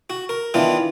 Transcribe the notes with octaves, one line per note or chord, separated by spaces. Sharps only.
F#4
A#4
D#3 E3 B3 D4 F4